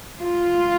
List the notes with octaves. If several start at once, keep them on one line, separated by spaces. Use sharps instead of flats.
F4